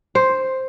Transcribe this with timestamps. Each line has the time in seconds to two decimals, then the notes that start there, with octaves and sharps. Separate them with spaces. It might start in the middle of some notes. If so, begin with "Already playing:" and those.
0.15 C5